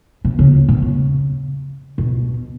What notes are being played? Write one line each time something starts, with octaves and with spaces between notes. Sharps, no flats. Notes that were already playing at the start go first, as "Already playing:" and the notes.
B2
C#3
B2
C#3
B2